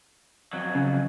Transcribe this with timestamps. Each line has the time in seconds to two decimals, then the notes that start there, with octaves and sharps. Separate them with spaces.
0.53 F2 F#3
0.75 C#3